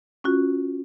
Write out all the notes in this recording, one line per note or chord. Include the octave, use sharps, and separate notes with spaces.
C#4 F4 F#4